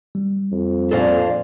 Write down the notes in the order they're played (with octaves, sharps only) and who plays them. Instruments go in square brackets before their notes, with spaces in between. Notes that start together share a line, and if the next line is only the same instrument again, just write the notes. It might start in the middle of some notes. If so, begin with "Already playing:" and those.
[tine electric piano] G3
[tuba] F2
[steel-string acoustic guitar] A#2 D4 [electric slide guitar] A4 C5 F5